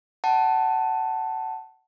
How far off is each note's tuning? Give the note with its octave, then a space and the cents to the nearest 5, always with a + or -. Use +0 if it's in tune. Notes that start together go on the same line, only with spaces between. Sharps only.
F#5 +25 A5 +0